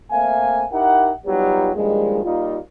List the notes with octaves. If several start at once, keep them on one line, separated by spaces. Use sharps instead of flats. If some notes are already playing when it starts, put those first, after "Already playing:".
A3 A#3 C4 E5 F5 G#5
D#4 E4 G4 A#4 F#5
F#3 G3 B3 D#4 F4 G4
G2 A#2 D#3 F3 G3 G#3
G3 A#3 D#4 F4